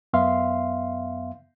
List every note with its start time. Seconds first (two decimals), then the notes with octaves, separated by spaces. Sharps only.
0.13 F#2 B3 E5 F5 C6